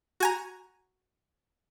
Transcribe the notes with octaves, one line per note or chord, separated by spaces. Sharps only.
F#4 G#5 A#5